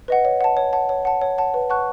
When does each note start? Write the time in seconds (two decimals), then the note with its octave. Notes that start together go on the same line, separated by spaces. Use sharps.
0.08 B4 D#5 F#5
0.25 C#5
0.41 F#5 A5
0.57 C#5
0.73 F#5 A5
0.89 C#5
1.05 F#5 A5
1.21 C#5
1.38 F#5 A5
1.54 B4
1.70 F#5 A5 C#6 F#6